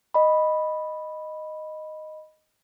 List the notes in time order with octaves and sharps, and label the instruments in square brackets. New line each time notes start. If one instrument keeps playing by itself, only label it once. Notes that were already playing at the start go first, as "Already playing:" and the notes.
[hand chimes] D#5 B5